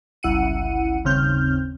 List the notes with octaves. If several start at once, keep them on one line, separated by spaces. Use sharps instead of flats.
G1 C#2 E4 F#5 C#7 D#7
G1 D#2 C#3 C4 F6 G6